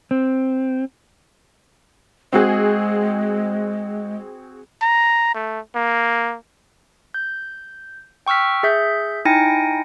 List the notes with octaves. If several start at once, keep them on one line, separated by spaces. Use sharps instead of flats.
C4
G#3 C4 F#4 G#4
A#5
A3
A#3
G6
G5 C#6 E6 F6 B6
G#4 E5 G6
D#4 E4 G5 G#5 A#6 C#7